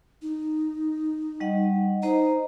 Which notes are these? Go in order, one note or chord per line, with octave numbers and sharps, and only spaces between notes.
D#4
G3 D#5 F#5
D#4 C5 D#5 A#5